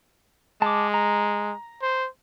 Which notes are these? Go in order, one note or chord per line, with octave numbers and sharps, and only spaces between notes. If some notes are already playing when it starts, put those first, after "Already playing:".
G#3 A5 D6
A#5
C5